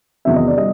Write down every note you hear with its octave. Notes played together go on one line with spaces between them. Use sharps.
E2 C3 D#3 F#3 B3 E5
D#5
D5
G3 D#5